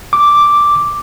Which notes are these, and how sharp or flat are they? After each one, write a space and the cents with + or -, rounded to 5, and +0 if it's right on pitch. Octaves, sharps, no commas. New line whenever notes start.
D6 +0